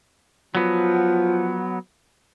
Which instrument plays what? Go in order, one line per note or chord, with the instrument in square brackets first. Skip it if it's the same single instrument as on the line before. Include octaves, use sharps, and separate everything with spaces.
[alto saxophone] F3 [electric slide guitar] F#3 B3